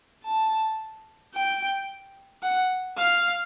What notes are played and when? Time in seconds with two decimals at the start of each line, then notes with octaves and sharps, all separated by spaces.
0.25 A5
1.34 G5
2.43 F#5
2.97 F5